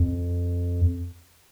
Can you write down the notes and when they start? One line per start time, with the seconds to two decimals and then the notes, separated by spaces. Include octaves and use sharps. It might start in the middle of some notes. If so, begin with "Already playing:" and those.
Already playing: F2